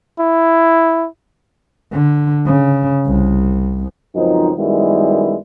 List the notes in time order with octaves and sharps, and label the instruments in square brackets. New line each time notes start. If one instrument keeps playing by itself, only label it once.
[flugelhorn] E4
[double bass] D3
C#3
C2
[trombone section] C#2 F#2 F3 C4 D#4
F#2 D#3 G3 G#3 B3 E4